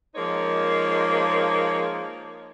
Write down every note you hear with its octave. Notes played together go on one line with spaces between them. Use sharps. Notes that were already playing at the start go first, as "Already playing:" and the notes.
F3 G#3 A#3 D#4 C5 C#5